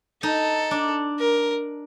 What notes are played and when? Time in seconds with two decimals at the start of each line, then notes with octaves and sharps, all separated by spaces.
0.23 D#4 A4
0.71 D4
1.19 A#4